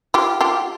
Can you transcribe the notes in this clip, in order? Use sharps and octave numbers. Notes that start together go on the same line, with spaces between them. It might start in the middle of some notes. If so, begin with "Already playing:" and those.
F4 G4
F4 G4